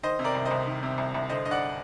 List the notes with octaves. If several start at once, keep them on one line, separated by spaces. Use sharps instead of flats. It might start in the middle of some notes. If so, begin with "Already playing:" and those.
D#3 C5 D#5
C3
A#4 D5
C2
C5 D#5
C2
D#3
C3
C2
C2
D3 C5 D#5
G2 D#5
D5 F#5